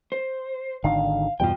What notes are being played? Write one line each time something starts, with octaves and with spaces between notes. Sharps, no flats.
C5
G#1 D3 D#3 F5
E2 G2 B2 F4 G5